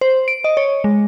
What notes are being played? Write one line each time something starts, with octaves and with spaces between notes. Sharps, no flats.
C5
D7
D#5
C#5
G#3